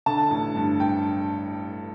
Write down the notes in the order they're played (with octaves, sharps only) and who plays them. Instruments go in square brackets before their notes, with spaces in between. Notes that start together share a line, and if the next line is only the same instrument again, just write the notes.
[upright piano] D3 A5
A1
G2
G5